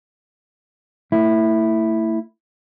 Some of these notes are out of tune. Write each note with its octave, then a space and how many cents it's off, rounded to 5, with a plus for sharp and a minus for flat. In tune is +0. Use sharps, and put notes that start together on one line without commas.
A3 +35 E4 +0